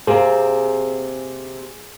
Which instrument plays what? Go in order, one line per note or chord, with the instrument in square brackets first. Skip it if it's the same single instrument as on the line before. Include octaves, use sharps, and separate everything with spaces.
[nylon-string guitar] C3 A#3 C4 [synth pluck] G#4